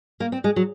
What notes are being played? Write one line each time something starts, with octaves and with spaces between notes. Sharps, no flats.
A#3
C4
G#3
F#3